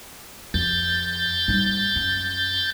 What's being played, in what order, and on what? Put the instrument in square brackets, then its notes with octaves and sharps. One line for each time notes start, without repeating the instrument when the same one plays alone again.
[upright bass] F2 [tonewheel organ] G6 A6
[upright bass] G#2 G3
F#2